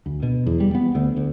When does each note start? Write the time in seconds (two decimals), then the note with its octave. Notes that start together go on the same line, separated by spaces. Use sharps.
0.06 D2
0.23 B2
0.46 E2
0.60 G3
0.75 B3
0.95 D2
1.17 D2